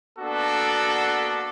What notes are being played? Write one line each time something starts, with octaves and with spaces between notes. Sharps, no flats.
A#3 B3 D4 F#4 A4